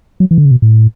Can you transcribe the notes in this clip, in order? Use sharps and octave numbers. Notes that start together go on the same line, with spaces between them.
F#3
E3
D3
C#3
B2
A2